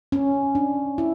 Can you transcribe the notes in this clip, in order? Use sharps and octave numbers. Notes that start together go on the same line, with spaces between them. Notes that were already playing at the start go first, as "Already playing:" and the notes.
C#4
D4
E4